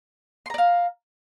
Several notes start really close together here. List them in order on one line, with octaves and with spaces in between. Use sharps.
C6 A#5 D5 F5